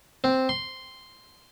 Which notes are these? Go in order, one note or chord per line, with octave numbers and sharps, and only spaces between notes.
C4
C6